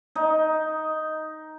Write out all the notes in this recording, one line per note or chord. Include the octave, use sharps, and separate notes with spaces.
D#4